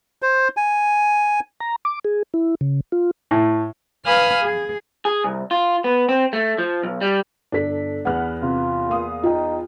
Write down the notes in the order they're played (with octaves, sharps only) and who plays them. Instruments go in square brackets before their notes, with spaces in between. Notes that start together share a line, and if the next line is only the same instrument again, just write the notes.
[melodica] C5
G#5
[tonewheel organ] A#5
D6
G#4
E4
C#3
F4
[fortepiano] A2
[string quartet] B4 F5 G#5 B5 D#6 F6
G#4
[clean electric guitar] G#4
C2
F4
B3
C4
A3
F3
B1
G3
[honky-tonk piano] G1 A4 [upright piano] D4 B6
[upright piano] E2 B3 [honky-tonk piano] F#5 F6 F#6
[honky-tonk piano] C3 [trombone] F4
[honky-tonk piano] A#3 F5 D#6
[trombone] D#4 [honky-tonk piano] F4 G5